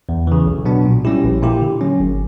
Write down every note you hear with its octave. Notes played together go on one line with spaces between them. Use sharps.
E2
C#3 E3
B1
B2 F#3 B3 D4
A#2
G3 C#4 E4 G4
A#1
A#2 A#3 E4 G4
D3
F#3 C#4
G1